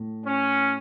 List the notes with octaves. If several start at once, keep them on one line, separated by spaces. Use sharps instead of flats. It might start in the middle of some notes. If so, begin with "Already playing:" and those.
Already playing: A2
C#4